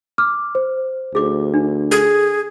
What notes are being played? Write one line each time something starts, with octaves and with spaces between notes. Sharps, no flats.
D6 F6
C5
D2 G#4 D6
D4
G#4 A4